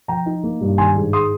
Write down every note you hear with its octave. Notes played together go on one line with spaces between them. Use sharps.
F3 G5 A#5
D#4
A#3
G2
D#3 G#5 C6
G#2
G#3 C6 D#6